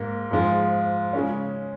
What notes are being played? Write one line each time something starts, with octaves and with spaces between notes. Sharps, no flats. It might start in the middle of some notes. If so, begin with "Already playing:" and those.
Already playing: G#2 A#3
G#2 F3 G#3
C#3 G#3 C#4